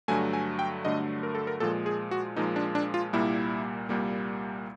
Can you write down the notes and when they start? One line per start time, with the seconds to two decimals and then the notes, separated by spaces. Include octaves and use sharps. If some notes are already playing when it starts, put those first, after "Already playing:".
0.08 G2 D3 F#3 A3 G#5
0.33 G#5
0.59 G5
0.85 G2 D3 F#3 A3 D#5
1.23 A#4
1.35 A4
1.47 A#4
1.60 A#2 F3 G#3 A4
1.86 G#4
2.11 F#4
2.36 A#2 F3 G#3 D#4
2.56 D4
2.75 D4
2.94 F4
3.13 C2 A#2 G3 A#3 E4
3.89 C2 A#2 G3 A#3